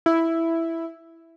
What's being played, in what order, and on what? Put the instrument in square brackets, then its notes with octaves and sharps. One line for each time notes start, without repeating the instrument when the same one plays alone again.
[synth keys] E4